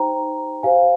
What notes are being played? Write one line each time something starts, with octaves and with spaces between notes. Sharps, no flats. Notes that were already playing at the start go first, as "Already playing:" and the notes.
Already playing: D#4 G4 C5 G5 A#5
G4 C5 F5 G#5